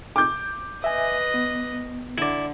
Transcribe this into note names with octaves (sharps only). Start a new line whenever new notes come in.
D6 G6
B4 D#5 E5 G#5
B3
D3 E4 D5